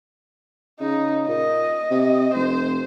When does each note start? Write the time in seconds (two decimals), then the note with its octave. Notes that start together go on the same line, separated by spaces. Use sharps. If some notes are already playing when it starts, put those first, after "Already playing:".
0.80 C#3 D#4
1.28 A#2 D#5
1.90 C3
2.34 F1 C5